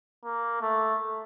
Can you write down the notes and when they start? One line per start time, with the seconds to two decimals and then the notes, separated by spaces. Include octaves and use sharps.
0.24 A#3
0.61 A3